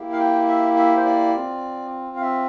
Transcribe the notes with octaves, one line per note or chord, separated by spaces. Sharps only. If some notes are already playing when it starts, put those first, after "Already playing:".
Already playing: A#3 E4 G4
F5
G5
E5
E5
C5
D5
C4 F4
F5
E5